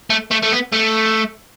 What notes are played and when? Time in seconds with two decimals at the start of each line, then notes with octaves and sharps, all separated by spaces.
0.10 A3
0.31 A3
0.42 A3
0.52 B3
0.72 A3